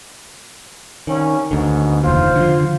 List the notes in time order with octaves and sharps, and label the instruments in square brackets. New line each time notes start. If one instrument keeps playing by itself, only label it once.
[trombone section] C2 C#4 [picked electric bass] D#3
[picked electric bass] D2 D3 [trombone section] G#2 B2
[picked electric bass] F1 D#2 [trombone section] F4 C5
[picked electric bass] D3 F3